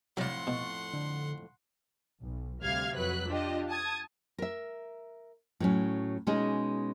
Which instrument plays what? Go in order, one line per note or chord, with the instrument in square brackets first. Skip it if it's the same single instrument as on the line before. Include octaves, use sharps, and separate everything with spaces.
[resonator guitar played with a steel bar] F2 A2 [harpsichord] F#3 D5 [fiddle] F#5 C6
[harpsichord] B2 [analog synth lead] C#6
[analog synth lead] D3
[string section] B1
D2 C3 G3 F5 F6 G#6
F2 F#3 B4 F#6 B6
D4 F4 G4 D#5
A5 D#6 G#6
[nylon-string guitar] A#4 E5
A2 F#3 C#4
B2 G#3 C#4 D#4 G#4